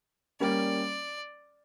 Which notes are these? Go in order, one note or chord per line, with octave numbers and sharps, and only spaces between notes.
G3 A#3 C#4 D5